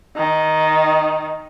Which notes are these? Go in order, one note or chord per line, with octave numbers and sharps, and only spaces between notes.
D#3